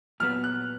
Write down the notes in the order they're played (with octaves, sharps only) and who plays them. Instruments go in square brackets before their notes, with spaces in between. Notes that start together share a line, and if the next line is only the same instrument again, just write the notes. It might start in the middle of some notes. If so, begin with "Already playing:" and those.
[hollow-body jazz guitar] A#2 F#3 B3 [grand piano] F6
[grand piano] F#6